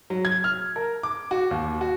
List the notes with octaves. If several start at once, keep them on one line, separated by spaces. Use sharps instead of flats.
F#3
G#6
F6
A#4
D6
F#4
D#2
F#4